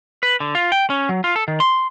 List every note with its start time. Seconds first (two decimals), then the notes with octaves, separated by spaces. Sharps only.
0.23 B4
0.40 D3
0.55 F4
0.72 G5
0.90 C#4
1.09 F#3
1.24 F4
1.36 A4
1.48 D#3
1.60 C6